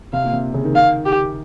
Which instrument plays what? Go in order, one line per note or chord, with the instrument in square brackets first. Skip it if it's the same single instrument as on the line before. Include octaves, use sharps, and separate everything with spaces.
[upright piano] C3 [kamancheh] F5
[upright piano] A#2
C3
C#3
D#3
[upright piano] D#3 [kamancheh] F5
[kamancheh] G4